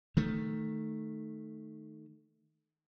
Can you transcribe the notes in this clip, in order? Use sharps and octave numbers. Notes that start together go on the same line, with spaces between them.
D#3 A3